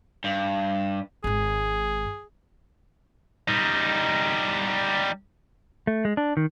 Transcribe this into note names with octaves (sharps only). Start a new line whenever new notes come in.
G2
G#1 G#2 G#4
G3 D#4
A3
G#3
D4
D#3